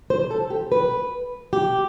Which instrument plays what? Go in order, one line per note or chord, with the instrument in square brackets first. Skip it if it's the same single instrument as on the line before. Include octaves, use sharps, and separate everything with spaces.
[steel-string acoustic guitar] C5
A4
G4
B4
G4